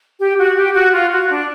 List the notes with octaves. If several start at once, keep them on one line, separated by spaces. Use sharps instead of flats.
G4
F#4
G4
F#4
F4
F#4
D4